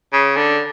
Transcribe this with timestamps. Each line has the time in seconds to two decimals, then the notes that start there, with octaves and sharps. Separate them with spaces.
0.13 C#3
0.36 D3